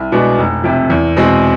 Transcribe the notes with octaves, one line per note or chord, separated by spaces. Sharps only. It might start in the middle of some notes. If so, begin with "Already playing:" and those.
Already playing: C2
B2 G#3 B3 D4
F1
F2 C3
E2
B2 G#3 C4